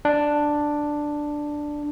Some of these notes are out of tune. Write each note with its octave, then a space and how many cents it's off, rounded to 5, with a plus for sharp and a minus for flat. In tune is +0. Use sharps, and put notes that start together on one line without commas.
D4 +5